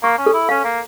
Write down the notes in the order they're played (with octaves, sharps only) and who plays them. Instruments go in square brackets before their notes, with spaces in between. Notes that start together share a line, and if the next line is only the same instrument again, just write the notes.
[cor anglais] A#3 [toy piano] C#6
[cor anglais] C#4
[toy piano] A4
[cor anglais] E4
[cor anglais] C#4 [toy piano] F5
[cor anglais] A#3